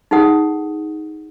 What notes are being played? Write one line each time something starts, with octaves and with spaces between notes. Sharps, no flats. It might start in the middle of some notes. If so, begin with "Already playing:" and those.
D#4 G#4 A4 F#5 D#6